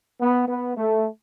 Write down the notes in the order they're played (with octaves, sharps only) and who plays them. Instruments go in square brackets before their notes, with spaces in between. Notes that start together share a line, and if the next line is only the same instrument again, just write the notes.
[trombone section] B3
B3
A3